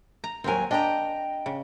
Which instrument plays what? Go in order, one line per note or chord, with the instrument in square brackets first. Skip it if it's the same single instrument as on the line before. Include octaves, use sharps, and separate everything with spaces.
[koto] A#5
[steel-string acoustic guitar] D#2 F#3 G#5 [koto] C4 A#4
[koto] D4 G4 [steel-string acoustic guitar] D#5 G5 A#5
[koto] C#3